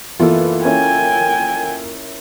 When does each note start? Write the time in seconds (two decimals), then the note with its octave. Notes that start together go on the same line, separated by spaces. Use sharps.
0.20 F#1 E3 B3 F4 A4
0.64 A#3 C#4 E4 G5 G#5